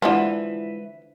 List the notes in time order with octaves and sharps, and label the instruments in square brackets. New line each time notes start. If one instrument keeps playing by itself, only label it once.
[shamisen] D3 E3 F3 [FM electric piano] G#3 E4 F4 [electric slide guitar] B4 E5